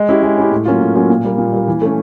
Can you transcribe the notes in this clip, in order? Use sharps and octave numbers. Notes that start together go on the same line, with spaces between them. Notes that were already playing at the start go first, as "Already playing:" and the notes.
Already playing: G#3
C#4 E4 G4
G#3
C#4 E4 G4
A2
F#3 A#3 C#4 F4
A2
F#3 A#3 C#4 F4
A#2
G3 A#3
A#2
G3 A#3
E3
A3 C#4